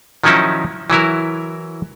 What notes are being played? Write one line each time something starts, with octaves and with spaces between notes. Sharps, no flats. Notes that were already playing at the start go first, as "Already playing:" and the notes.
D#3 F3 F#3 C#4 D#4 E4
E3 F#3 E4 A#4